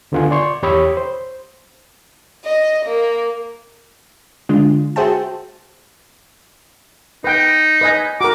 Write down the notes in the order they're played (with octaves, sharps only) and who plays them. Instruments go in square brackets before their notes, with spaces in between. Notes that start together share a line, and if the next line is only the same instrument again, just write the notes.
[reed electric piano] D2 D3 B3 F4 F#5 G#5
D5 C6 C#6
E2 G4 C#5 B5 D#6 E6
C5
[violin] D#5
A#3
[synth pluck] D3 G#3 D4 F4
F#4 G#4 C5 E5 G5 A5
[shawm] D#4 [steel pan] B4 G5
[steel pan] B4 D#5 G#5
[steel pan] F#4 A#4 [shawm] D6